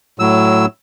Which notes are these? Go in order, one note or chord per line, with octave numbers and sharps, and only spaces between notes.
A2 F#3 E6